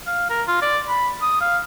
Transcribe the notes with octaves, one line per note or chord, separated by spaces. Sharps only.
F5
A#4
F4
D5
B5
D#6
F5